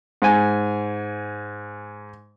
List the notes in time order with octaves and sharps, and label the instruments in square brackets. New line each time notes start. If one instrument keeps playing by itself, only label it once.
[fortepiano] G#2 G#5